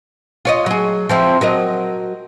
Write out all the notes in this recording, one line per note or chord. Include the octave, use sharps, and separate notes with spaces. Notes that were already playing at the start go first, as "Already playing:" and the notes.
F4 C#5 D#5
F#3 G#4
F3 C4 E4
F#3 A#4 D#5